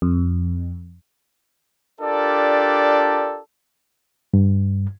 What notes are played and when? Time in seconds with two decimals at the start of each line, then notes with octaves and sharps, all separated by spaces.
0.02 F2
2.00 D4 F4 G4 A4 A#4 D5
4.34 G2